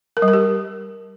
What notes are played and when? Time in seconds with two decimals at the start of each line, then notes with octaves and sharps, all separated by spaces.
0.17 A#4
0.22 G3
0.28 A#4
0.33 G4